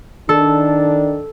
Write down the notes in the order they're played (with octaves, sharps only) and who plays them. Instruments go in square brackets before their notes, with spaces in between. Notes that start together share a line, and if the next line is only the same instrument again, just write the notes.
[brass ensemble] D#3 D4 [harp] A4